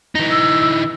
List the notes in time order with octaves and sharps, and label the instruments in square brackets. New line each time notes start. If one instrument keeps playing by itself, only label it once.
[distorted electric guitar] E3 D#4
[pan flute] E6